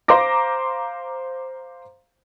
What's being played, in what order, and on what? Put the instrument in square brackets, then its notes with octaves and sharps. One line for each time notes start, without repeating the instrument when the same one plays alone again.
[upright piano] C5 F5 A#5 C6 D6 A#6